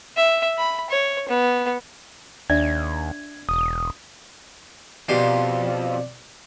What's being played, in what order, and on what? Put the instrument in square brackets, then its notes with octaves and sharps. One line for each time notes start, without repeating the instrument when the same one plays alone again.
[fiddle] E5
B5
C#5
B3
[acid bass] D#2 [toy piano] D4 D5 E5 [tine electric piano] G#6
[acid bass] E1 [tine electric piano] D#6
[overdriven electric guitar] F2 [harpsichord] B2 G4 F5 [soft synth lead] D5